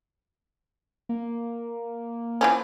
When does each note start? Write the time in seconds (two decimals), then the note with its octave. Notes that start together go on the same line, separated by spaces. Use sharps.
1.09 A#3
2.41 E3 F3 C#4